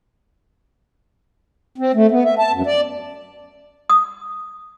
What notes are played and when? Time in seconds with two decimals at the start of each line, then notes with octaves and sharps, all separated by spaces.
1.78 C4
1.95 A3
2.11 B3
2.25 E5
2.39 A5
2.53 F#2
2.66 D5
3.90 D#6